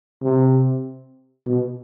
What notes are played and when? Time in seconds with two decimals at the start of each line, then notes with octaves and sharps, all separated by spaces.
0.22 C3
1.47 B2